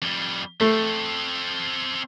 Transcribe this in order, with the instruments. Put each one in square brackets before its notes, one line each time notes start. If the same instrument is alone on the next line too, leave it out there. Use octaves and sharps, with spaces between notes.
[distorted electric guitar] F2 G3
[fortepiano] A3 [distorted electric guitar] C4 A4